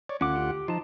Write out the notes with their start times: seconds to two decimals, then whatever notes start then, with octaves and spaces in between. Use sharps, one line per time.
0.09 C#5 D5
0.21 D2 C#4 F4 F#5 D6
0.36 G4
0.68 F3 D#4 F4 A5